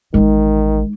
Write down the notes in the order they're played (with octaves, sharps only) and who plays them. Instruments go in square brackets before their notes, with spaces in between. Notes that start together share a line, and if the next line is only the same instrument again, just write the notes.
[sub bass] A1 [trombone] D#3 [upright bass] G#3 D#4